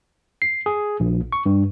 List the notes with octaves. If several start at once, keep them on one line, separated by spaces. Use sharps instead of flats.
C7
G#4
A#1
C#6
G2